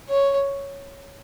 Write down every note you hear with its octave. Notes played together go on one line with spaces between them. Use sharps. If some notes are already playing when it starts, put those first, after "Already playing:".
C#5